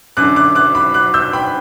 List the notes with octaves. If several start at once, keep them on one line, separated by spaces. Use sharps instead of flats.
F#2 D3 D6 F#6
D6 F#6
D6 F#6
B5 D6
D6 F#6
E6 G6
G5 B5